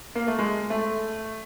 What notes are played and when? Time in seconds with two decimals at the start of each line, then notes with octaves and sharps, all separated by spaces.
0.15 A#3
0.27 A3
0.39 G#3
0.70 A3